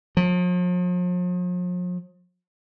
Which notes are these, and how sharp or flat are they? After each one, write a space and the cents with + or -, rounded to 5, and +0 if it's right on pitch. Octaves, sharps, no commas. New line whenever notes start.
F3 +45